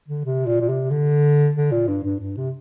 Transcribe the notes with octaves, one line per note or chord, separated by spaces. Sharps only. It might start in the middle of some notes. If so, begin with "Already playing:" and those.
D3
C3
A#2
A#2
C3
D3
D3
A#2
G2
G2
G2
C3